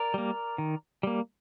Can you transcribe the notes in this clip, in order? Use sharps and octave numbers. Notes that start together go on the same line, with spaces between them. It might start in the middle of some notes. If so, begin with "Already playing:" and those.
Already playing: A#4 D5
G3 A#3
D#3
G3 A#3